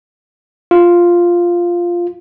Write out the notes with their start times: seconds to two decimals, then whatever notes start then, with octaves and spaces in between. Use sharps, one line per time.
0.71 F4